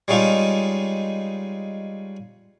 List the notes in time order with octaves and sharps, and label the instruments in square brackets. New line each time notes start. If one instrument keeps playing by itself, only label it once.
[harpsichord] G3 G#3 C#4 D#4 F4